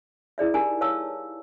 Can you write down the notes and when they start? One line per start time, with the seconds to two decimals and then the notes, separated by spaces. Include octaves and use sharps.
0.38 E4 G#4 D5 E5
0.54 D#4 G4 A#4 G#5 A#5
0.81 B4 C#5 F5 A5 C#6 E6